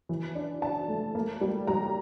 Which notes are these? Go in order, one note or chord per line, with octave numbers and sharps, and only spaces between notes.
E3
D4
D4 A5
A3
A#3
G3
G3 A#5